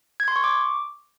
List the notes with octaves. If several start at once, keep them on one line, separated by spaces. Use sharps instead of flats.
G#6
C6
C#6
D6